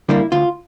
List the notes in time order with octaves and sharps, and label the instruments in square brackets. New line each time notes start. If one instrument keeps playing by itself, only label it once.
[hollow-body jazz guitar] D3 G3 A#3 E4
D2 F4